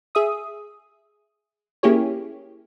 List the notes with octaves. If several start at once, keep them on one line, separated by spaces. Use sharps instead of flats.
G#4 E5 D#6
A#3 C#4 E4 G4 G#4 C#5